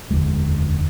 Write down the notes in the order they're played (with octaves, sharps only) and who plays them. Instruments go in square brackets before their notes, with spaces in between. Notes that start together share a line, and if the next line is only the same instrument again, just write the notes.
[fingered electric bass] F1 D#2 D3 G#3